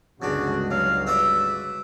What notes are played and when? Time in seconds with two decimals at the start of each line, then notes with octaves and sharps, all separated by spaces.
0.22 G1 C#2 C#3 G#3 D4 F#4
0.71 F#3 F5
1.07 F#4 B4 D5 E5